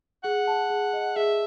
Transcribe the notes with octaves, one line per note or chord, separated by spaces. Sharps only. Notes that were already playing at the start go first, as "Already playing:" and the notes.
G#4 F#5
A5
G#4
D#5
G#4 E5